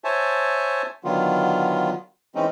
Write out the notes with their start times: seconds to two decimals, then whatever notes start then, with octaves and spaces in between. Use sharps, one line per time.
0.04 C5 C#5 E5 G#5 A5
1.04 D3 D#3 F#3 B3 F4
2.35 E3 G#3 C4 C#4 D#4